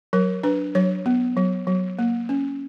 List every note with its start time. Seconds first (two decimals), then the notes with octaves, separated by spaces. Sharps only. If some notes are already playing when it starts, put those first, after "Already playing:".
0.13 F#3 A#4
0.44 D4 B4
0.75 F#3 C#5
1.06 B3
1.37 F#3
1.67 F#3
1.99 A#3
2.29 C#4